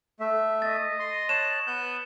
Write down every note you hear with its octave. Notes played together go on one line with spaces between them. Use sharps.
A3 E5
D#5 A6
C6
C#5 A5 F#6 E7
B3 F#6 G6